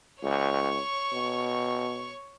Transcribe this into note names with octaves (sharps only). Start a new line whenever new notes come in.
C#2 C#5 C#6
B2